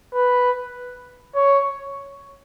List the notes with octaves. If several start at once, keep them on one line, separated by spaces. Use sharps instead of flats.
B4
C#5